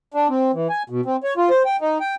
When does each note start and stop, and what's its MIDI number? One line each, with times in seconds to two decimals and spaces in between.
0.14 0.28 62
0.29 0.51 60
0.54 0.68 52
0.70 0.83 80
0.90 1.01 47
1.05 1.16 60
1.24 1.34 73
1.37 1.49 65
1.50 1.63 72
1.65 1.76 79
1.81 1.98 63
2.00 2.15 79